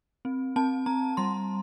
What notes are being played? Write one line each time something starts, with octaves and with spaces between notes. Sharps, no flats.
C4
C4 A5
C4 A#5
G3 C6